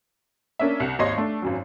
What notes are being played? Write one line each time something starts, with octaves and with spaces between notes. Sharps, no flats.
A#3 C#4 D4 E5
C2 C#7
G#1 D#2 C#5 D#5 C6 C7
A3 D4
G#1 F#2 F#3